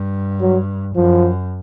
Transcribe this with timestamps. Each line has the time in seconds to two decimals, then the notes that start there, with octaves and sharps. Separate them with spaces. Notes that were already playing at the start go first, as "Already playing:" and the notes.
Already playing: G2
0.41 F#3
0.95 F#2 F3